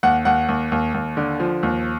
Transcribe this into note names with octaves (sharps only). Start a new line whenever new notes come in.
D#2 F#5
D#2 F#5
D#2
D#2
D#2
D3
F3
D#2